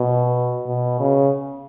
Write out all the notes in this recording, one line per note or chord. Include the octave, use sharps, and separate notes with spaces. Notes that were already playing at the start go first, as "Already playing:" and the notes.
Already playing: B2
B2
C#3